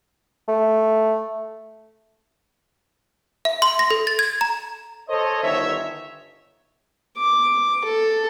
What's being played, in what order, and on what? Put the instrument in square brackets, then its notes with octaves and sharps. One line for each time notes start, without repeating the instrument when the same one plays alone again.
[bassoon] A3
[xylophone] E5
C6
A#6
A4
A6
G#6
A#5
[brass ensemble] A4 C5 C#5 D#5
G1 D#3 C#5 E5
[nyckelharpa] D6
A4